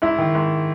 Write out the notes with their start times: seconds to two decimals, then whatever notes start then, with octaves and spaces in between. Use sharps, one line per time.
0.02 G#2 E4
0.19 D#3
0.35 G#2